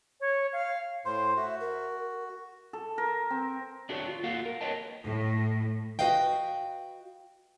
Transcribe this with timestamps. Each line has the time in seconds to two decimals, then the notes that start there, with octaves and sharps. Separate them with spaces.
0.19 C#5
0.52 F5
1.05 A2 C5 C6
1.37 F#4 E5
1.60 A#4
2.73 A4
2.98 A#4
3.30 C4
3.89 D4 F#4 G4 A#4 C#5 D5
4.07 F4
4.24 A#3 F4 F#4 A4 F5 F#5
4.46 A#4
4.61 B4 C#5 D#5 G5 A5
5.03 A2
5.99 F#4 G#4 B4 D#5 F5 G5